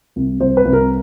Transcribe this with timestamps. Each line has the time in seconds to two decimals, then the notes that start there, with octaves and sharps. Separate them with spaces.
0.16 C2
0.40 C2 C5
0.57 B4
0.65 C2
0.73 A#4